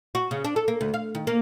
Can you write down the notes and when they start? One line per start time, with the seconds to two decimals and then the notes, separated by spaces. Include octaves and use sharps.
0.15 F#4
0.31 C#3
0.44 D4
0.56 A4
0.68 A#3
0.81 D2
0.94 F5
1.15 D#3
1.27 A#3